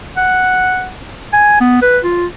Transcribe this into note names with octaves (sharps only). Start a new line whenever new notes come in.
F#5
G#5
B3
B4
F4